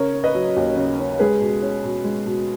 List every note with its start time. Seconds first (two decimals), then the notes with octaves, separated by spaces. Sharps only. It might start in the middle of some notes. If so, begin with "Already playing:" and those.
Already playing: C#3 A#4 C#5
0.13 C#4
0.24 B4 D#5
0.35 F#3
0.56 D#2
0.77 C#3
0.99 C#4
1.19 G#3 G#4 B4
1.40 B2
1.62 C#4
1.84 B2
2.04 G#3
2.26 B2